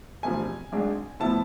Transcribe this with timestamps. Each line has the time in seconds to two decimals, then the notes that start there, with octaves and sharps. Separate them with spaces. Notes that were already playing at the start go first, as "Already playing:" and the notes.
0.23 E1 D2 C3 F3 G#5
0.72 G#1 G#2 G#3 D4
1.20 A2 F3 B3 E4 A5